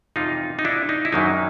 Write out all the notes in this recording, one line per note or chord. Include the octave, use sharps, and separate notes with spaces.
F2 C3 E3 G3 D#4 F4
D#4
D4 E4
D#4
E4
F#2 D#3 F#3 A#3 D4 D#4